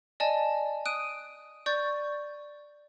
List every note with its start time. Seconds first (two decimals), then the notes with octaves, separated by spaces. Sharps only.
0.20 D5 D#5 G#5 A5
0.85 D#6 F#6 D7 D#7
1.66 D5 C#6 G6 A6